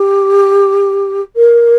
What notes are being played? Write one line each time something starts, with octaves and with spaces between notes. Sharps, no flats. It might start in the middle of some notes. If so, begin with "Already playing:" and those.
Already playing: G4
A#4